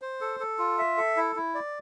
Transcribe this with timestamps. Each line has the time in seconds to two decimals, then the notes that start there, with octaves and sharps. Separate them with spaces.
0.02 C5
0.21 A4
0.40 A4
0.59 F4
0.78 E5
0.97 A4
1.17 E4
1.36 E4
1.55 D5